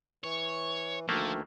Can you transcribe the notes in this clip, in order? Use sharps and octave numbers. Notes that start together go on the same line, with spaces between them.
E3 C#5
D2 D#3 F3 A3 A#3